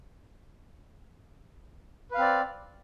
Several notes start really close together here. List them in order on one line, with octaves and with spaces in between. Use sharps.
B4 F5 C4 D5